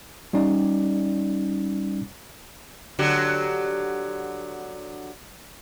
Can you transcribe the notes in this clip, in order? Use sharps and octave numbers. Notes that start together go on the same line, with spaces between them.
G3 C#4 D#4 D5
D3 F#3 G4